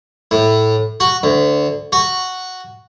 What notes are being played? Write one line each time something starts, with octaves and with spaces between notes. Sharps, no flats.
A2
F#4
D2
F#4